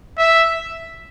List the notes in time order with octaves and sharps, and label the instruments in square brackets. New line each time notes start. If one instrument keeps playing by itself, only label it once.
[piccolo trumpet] E5